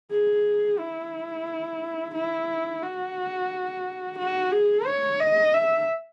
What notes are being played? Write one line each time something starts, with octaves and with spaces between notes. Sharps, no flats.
G#4
E4
E4
F#4
F#4
G#4
C#5
D#5
E5